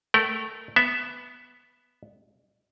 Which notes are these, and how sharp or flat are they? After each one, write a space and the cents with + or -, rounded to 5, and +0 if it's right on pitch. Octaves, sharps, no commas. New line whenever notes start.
A3 +0 A#4 +0 G5 -40
B3 +0 E5 +0